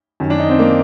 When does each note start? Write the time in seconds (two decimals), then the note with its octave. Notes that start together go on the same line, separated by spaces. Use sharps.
0.20 F#2 D#3
0.30 D4
0.39 D#4
0.49 C4
0.59 A#3